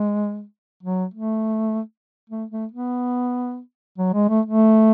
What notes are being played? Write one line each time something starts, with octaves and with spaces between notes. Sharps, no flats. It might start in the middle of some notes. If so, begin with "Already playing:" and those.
Already playing: G#3
F#3
A3
A3
A3
B3
F#3
G#3
A3
A3